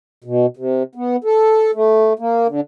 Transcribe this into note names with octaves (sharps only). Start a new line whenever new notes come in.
B2
C3
B3
A4
A3
A#3
D3